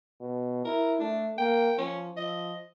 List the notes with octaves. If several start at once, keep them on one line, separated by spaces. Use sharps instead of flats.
B2
E4 A#4
A3 D4
A#3 G5
F3 C#4
F3 D#5